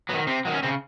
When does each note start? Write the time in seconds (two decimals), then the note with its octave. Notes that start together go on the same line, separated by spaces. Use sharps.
0.09 F#3 B3
0.13 D#3
0.27 C3 C4
0.45 D#3 F#3
0.54 C#4
0.63 C#3 C4